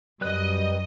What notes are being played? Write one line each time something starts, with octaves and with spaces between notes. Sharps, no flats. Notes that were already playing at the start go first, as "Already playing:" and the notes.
F#2 G3 B4 D#5 F#6